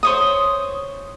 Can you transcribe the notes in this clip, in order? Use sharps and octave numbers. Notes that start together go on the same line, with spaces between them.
C5 C#5 D#6